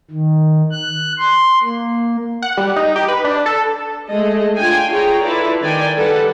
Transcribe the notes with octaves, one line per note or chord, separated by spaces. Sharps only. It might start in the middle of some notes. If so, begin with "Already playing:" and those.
D#3
F#6
C6
A#3
F#5
G3
D#4
G4
B4
D4
A4
G#3 A3 G#4 A4 D#5
D4 F4 G5 G#5
F4 G#4 C#5 G5 A#5
E4 F4 A4 B4 D5
D#3 D5 G5 G#5
G3 G4 A4 B4 D5 F#5